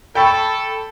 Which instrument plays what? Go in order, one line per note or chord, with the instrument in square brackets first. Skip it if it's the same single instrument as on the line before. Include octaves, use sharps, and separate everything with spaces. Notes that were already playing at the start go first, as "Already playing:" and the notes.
[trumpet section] A4 [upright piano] G5 B5 C#6